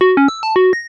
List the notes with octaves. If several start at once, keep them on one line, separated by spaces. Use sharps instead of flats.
F#4
C#4
E6
A5
F#4
A#6